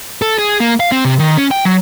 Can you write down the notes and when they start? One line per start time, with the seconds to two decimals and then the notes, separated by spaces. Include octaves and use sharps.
0.22 A4
0.39 G#4
0.60 A#3
0.80 F5
0.92 C4
1.05 C3
1.19 D#3
1.37 C#4
1.51 G5
1.65 F#3